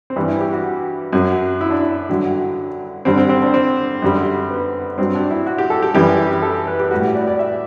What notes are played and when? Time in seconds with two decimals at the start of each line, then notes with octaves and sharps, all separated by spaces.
0.10 C4
0.16 G2 E3 G3 D4
0.28 E4
0.41 G4
0.53 F#4
1.13 F#2 F#3
1.61 E4
1.71 D4
1.81 E4
2.09 G2 D3 F#3
3.05 G2 D3 G3 C4
3.18 C4
3.29 C4
3.42 D4
3.54 C4
4.02 F#2 D3 G3
4.51 B3
4.98 G2 F#3 C4
5.15 D4
5.30 E4
5.46 F#4
5.58 G4
5.70 A4
5.83 G4
5.94 F#2 E3 G3 G4
6.42 A4
6.67 B4
6.79 G4
6.91 A2 G3 F#4
7.03 G4
7.15 D5
7.28 D5
7.39 E5